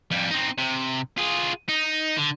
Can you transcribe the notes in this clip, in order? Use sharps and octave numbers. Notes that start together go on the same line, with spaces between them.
F2 G3
C4 D#4
C3
F4 G#4
D#4
D3